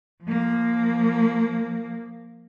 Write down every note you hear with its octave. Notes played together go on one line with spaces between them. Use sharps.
F3 A#3